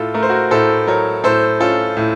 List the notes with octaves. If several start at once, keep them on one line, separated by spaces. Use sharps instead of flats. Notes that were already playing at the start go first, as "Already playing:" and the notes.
Already playing: A2 F4 A4
A3 A#4
C5
F#4 A#4
A2 A4 C5
F#3 A#4 C#5
A2 A4 C5
C#4 F4 A4
A2